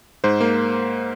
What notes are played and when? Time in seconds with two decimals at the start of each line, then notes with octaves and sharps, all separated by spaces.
0.24 G#2 C5
0.40 A#3